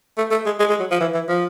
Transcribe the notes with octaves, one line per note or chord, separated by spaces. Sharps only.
A3
A3
G#3
G#3
G#3
F#3
F3
E3
E3
F3